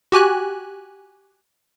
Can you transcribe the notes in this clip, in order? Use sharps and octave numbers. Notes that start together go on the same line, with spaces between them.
F#4 G4 G#5 F#6